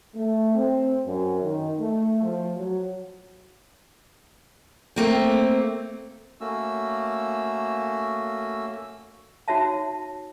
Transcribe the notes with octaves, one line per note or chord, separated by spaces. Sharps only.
A3
C4
F#2
D#3
A3
F3
F#3
A3 A#3 C4
A3 A#3 C#4 F#4 E6
D#4 F#4 C#5 E5 A5